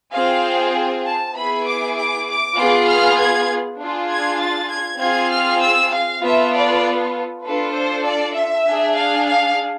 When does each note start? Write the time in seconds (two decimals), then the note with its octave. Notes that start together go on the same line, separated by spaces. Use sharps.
0.13 C4 F4 G#4 F5
1.05 A5
1.35 B3 E4 G#4 B5
1.65 D6
1.96 D6
2.27 D6
2.57 B3 F4 G#4
2.87 F6
3.18 G#6
3.79 D4 F4 G#4
4.09 G#6
4.40 A6
4.70 G#6
5.00 C4 F4 G#4 G#6
5.31 F6
5.61 E6
5.92 F5
6.23 B3 F4 A4 E5
6.54 D5
7.45 D4 F4 A4 B4
7.75 C5
8.05 D5
8.36 E5
8.67 D4 G#4
8.97 F5
9.27 F5